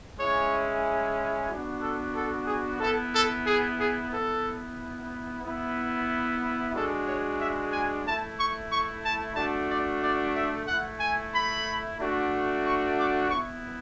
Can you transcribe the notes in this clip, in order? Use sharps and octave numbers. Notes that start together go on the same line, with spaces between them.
G#3 C#4 E4 C#5
B3 D4 F#4
A4
A4
G#4
B3 E4 A4
A4
G#4
G#4
B3 E4 A4
B3 E4
G#3 D4 F#4 A4
C#5
E5
G#5
A3 E4 A5
C#6
C#6
A5
A3 D4 F#4 A5
D5
D5
E5
A3 E4 F#5
G#5
B5
A3 D4 F#4
C#6
D6
B3 E4 C#6